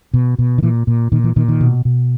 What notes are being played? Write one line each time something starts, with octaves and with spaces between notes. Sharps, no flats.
B2
B2
D#3
A#2 E3
A#2
A#2 D#3
E3
A#2 D#3
D#3
B2
B2